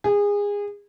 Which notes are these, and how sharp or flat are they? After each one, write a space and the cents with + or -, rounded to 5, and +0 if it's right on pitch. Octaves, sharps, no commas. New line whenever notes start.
G#4 -25